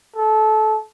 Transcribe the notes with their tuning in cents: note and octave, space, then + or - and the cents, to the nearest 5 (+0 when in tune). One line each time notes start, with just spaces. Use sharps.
A4 -25